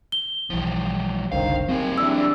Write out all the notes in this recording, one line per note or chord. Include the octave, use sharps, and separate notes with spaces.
G7
B1 E3 F3 G3
F#1 C2 D3 D#3 C5 F5
D#2 F#3 C4 G#4
E3 G3 D4 E6